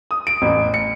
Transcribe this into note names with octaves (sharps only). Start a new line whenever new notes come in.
D#6
D7
A1
C#7